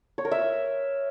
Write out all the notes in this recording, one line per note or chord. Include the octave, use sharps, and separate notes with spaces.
C#5
A#4
E5